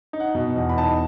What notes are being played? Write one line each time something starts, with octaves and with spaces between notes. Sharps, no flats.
D#4
F#5
B2
E2
B5
D#4 A5